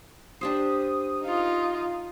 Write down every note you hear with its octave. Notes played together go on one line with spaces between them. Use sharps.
D4 G4 C5 D#6
D#4 F4